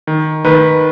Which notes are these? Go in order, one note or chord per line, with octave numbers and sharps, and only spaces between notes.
D#3
D#3 B4